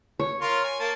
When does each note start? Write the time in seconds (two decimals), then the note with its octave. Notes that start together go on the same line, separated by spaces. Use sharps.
0.20 C#5
0.41 F4 A#4 C6
0.64 G#5
0.80 A#3 A5